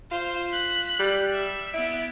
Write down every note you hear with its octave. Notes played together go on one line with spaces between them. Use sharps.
F4 C5
F#6 B6
G3
E5
B3 E4 D7